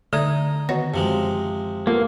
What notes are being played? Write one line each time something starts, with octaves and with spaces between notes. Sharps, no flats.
D3 A3 D#4 D#6 G#6
D#3 B3 F#4 C#5 A#6
F#2 C3 F3 G#3
A#3 B3 F4 A4